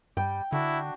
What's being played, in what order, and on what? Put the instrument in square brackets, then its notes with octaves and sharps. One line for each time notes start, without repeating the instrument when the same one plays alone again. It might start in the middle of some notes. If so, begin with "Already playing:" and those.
[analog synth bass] G2 [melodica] G3 [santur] G5
[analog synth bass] D3 [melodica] D4 F#4 [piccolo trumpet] E4